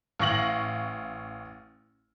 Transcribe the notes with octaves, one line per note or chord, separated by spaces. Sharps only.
A1 F5 C#6 A#6 F#7